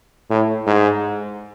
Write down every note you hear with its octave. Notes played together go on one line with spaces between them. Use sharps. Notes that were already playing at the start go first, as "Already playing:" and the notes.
A2
G#2